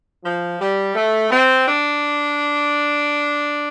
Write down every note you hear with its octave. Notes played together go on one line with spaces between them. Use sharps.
F3
G3
A3
C4
D4